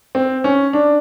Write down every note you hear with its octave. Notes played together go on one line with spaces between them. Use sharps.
C4
C#4
D4